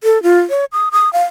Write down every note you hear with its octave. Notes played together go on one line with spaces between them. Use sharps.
A4
F4
C#5
D#6
D#6
F5